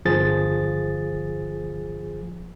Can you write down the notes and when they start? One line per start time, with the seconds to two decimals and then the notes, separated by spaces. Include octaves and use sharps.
0.05 G1 F3 G#4 A6